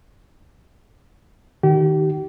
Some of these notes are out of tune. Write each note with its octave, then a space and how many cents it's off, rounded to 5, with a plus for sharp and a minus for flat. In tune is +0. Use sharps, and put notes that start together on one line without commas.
D#3 +0 G4 -35